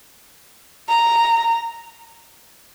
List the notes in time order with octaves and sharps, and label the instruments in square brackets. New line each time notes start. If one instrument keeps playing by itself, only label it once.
[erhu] A#5